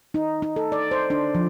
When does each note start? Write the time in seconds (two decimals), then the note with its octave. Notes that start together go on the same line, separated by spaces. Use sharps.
0.14 D#4
0.42 D#4
0.56 A4
0.72 D5
0.91 C5
1.10 D4
1.35 F3